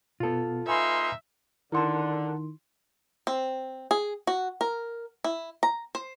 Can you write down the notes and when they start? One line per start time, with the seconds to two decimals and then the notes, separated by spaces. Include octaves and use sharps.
0.20 B2 B3 F4 A4
0.67 A#3 D#4 B4 E5 G#5 B5 C6
1.72 D3 D#3 E4 A#4 F#5 A5 C6
3.27 C4
3.91 G#4
4.27 F#4
4.61 A#4
5.24 E4
5.63 A#5
5.95 C5